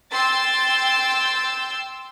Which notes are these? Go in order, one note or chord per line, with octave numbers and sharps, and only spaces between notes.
G5 C6 E6 A6